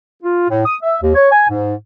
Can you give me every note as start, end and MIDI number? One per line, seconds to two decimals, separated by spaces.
0.23 0.47 65
0.49 0.63 45
0.65 0.76 87
0.82 0.97 76
1.02 1.11 39
1.15 1.30 73
1.31 1.48 80
1.48 1.74 44